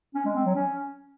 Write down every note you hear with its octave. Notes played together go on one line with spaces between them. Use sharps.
C#4
G#3
C4
F#3
C#4